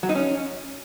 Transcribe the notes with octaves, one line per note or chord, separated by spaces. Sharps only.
F#3
D#4
C#4